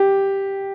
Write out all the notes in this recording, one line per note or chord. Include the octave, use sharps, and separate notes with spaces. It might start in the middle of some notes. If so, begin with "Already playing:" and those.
Already playing: G4